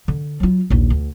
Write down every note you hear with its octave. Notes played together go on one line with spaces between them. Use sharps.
D3
F#3 F4
A#1 D#2
D2